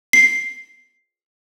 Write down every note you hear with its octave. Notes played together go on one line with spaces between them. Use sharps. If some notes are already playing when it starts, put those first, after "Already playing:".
C7